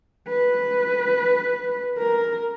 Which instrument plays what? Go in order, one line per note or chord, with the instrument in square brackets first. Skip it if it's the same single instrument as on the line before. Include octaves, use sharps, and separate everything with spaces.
[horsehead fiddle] B4
A#4